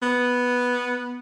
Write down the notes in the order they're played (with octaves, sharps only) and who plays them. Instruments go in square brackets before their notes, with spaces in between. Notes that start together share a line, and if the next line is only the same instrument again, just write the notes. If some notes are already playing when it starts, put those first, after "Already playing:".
[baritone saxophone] B3